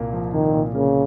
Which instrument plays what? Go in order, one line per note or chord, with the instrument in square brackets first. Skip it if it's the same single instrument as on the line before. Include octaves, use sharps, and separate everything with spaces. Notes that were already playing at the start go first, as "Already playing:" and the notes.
Already playing: [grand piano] C2 A#2 A#3
F3
[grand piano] C2 [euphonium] D#3
[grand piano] A#2
[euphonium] C#3 [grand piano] A#3